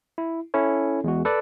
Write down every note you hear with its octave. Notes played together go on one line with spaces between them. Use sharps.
E4
C#4 E4 A4 C#5
E2 G#3 F#4
A4 B4 D5